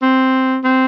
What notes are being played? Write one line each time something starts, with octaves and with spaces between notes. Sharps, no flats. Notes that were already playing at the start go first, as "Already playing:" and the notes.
C4
C4